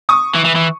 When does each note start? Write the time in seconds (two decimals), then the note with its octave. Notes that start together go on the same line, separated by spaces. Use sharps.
0.09 C#6 D#6
0.35 E3
0.45 E3
0.56 E3